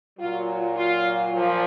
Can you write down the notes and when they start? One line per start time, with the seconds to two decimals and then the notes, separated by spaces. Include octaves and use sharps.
0.19 A#2 F#3 F4
0.75 F4
1.32 A#2 F3